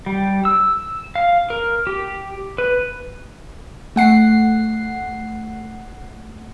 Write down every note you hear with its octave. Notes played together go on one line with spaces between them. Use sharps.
G3
E6
F5
A#4
G4
B4
A3 F#5 C7